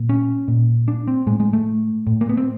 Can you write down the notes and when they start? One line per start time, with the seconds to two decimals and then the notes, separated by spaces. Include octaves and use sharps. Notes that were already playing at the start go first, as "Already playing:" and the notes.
Already playing: A#2
0.09 C#4
0.48 A#2
0.88 D4
1.08 C4
1.27 A2 G#3
1.40 G#3
1.53 A3
2.07 A2
2.21 A#3
2.29 B3
2.37 C4